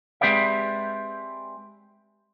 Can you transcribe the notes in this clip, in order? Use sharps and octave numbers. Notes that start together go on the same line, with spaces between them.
G#3 C4 G4 B4 D5 E5